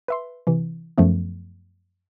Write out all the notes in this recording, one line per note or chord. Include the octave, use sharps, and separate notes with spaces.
B4 E5 C6
C3 E3
F#2 F3 A3 B3